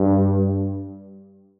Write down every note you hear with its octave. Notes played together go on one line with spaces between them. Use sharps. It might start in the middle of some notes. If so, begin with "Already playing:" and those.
Already playing: G2